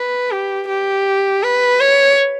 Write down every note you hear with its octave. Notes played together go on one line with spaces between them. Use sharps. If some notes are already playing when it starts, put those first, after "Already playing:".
Already playing: B4
G4
G4
B4
C#5